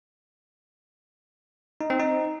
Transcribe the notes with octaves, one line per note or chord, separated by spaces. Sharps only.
D#4
C4
D#4